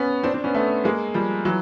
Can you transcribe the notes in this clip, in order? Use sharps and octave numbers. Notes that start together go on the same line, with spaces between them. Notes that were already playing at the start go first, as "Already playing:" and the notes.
Already playing: B3 C#4
C4 D4
C4 D4
B3 C#4
A3 B3
G#3 A#3
F3 G3
E3 F#3